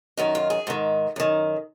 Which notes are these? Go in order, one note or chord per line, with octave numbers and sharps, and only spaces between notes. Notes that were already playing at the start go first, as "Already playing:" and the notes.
F#2 D#3 D#4
F4
G#4
G#2 D#3
F#2 D#3